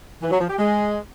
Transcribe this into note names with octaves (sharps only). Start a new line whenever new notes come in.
E3
F#3
F3
G4
G#3